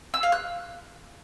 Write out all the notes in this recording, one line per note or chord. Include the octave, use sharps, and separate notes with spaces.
E6
F5
F#6